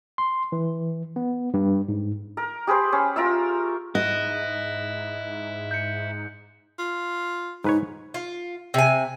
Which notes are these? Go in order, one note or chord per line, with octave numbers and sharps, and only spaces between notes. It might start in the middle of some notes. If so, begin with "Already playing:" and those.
C6
E3
B3
G2
G#2
A#4
G4 G#4 B4 C5
C#4
F4 A#4 E5 E6
G#2 E4 D#5 F#6
G6 C#7
F4
G#2 D#4 B4 C#5
F4
C3 G#5